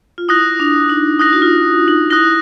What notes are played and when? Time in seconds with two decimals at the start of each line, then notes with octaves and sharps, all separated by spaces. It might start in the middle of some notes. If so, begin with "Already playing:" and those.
0.18 F4
0.29 E4 D#6 F#6 A#6
0.60 D4
0.89 D#4
1.19 E4 D#6 F#6 A#6
1.33 F#4
1.42 F4
1.88 D#4
2.10 E4 D#6 F#6 A#6